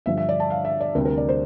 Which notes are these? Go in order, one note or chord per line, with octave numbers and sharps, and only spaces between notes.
G2 D3 F3 E5
E5
D5
A5
F5
E5
D5
D2 C3 G3 C4 A#4
A#4
D5
C5